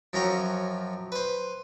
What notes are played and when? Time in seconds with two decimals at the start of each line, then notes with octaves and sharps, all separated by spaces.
0.13 F#2 F3 F#3 C#4 G5 A#5
1.12 B4 C5